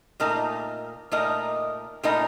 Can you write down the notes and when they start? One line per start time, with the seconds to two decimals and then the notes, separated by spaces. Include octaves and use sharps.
0.20 A#2 A3 D#4 A#4 D#5
1.12 A#2 A3 D#4 A#4 D#5
2.03 A#2 A3 D#4 A#4 D#5